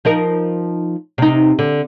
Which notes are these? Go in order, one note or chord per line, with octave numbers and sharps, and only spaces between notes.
F3 D#4 A#4
C3 D#4
D3